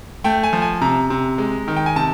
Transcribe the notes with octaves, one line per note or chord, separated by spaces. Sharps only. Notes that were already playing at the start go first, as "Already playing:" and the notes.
A3 G5
G#5
F3
G#5
C3 A#5
C3
G#3
D#3
G5
G#5
C3 A5